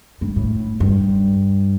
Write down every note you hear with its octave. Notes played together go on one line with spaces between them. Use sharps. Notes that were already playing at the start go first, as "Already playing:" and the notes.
G2
A2
G2